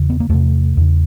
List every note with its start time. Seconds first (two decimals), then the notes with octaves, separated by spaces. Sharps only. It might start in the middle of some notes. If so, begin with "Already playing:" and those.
Already playing: E2 C#3
0.10 B3
0.20 A#3
0.29 E2 C3 A3
0.77 E2 C#3